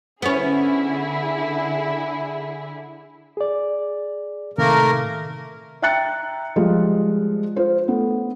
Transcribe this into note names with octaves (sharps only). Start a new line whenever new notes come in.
D3 B3 C#4 E4 G#4
G#4 D5
A2 C3 D#3 A3 A#3 A#4
E5 G5 A#5 F#6 A6 C#7
F3 G3 G#3 F4 D#5
F4 C5
A3 B3